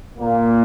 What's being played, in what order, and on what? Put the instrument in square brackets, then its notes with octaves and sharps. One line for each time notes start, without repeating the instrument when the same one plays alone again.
[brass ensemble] A#2 A#3